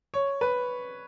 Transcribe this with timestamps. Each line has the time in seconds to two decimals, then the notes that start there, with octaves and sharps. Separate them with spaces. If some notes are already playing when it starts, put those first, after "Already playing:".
0.14 C#5
0.41 B4